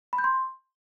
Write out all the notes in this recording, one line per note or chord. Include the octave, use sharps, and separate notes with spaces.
B5
G6
C6